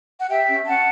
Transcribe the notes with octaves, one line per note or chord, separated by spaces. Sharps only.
F#5
G4 E5 G5
C#4
C#4 F#5 A5